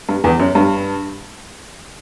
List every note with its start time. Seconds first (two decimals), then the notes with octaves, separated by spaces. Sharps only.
0.09 G2
0.24 E2
0.40 F#2
0.55 G2